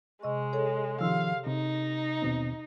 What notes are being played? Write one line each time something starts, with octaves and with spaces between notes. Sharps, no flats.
C3 G#3 D#5 C#6
G#4 A4 C#5
C3 D#3 F3 G4 F5 C6 E6
C3 D#4
D#2 B2 C4